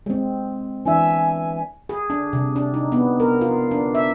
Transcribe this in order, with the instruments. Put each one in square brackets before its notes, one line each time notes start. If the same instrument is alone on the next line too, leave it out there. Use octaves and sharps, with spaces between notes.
[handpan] G#3 C4
[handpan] E3 D4 E5 [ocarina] G#5
[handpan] G#4
D4
C3
D4
D#4
B3
A#4
F4
D4
E5